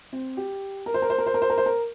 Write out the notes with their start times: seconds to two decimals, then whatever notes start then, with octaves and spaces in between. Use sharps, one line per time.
0.13 C4
0.37 G4
0.86 A#4
0.94 C5
1.02 A#4
1.10 C5
1.18 A#4
1.26 C5
1.34 A#4
1.42 C5
1.50 A#4
1.58 C5
1.66 A#4